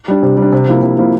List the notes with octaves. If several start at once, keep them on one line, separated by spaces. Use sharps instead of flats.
G3 D4
C3
G3
D4
C3
F3 A#3 E4
C3
F3 A#3 E4